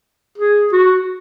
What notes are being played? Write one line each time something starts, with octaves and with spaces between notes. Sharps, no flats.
G#4
F#4